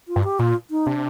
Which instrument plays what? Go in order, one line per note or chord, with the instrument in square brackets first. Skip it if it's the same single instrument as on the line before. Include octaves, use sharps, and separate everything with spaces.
[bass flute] F4
[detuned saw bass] G2
[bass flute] G4
[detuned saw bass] A#2 [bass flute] F4
[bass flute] D#4
[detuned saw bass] C3 [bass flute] D4